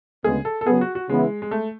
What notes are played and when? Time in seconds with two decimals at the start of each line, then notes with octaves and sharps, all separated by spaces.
0.24 D2 C#3 G#3 B3 G#4
0.45 A4
0.61 A4
0.66 C#3 F#3 B3 G#4
0.81 F#4
0.95 F#4
1.09 C#3 E3 G#3 B3 E4
1.42 G#3
1.51 A3